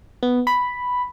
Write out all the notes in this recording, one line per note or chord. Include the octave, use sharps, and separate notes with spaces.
B3
B5